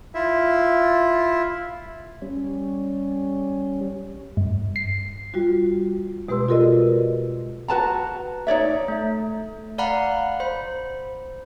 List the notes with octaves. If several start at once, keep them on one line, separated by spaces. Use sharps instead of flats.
E4 F4 E5
G3 C#4
G2
C7
G3 F4 F#4
B2 G#3 G4 B4 C6 E6
F4 F#4 A4 A#4 D5 D#5
F#4 B4 A5 A#5
D#4 C#5 D5 E5
A3
D5 F5 F#5 A#5 B5
C5 B5